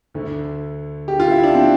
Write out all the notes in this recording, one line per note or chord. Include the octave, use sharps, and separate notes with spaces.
D2 D3
G4
F4
E4
D4
C4